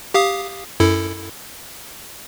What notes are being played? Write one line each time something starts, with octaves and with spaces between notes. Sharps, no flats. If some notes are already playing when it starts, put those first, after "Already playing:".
G4 F5 D#6
F#2 E4 A4